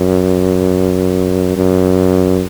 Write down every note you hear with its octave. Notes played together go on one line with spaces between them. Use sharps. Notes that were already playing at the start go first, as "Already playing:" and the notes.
Already playing: F#2
F#2